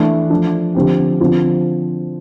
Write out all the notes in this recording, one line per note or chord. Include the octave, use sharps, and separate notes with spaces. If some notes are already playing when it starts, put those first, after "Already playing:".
Already playing: E3 A3 D4
F3 A3 D4
D3 F3 C4 G4
D3 F3 C4 F4